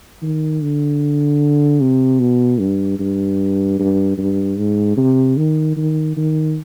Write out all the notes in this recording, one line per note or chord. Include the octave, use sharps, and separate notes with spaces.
D#3
D3
C3
B2
G2
G2
G2
G2
G#2
C3
D#3
D#3
D#3